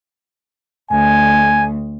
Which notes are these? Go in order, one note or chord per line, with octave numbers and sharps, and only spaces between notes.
D2 G#5